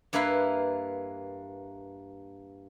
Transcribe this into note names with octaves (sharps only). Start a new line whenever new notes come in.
G2 A#3 E4 B4 F5